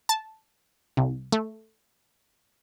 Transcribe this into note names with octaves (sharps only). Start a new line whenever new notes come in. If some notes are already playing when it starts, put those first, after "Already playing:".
A5
C2
A3